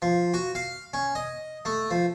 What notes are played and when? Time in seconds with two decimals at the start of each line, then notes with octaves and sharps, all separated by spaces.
0.02 F3
0.34 F#4
0.55 F5
0.94 C#4
1.15 D#5
1.65 A3
1.91 F3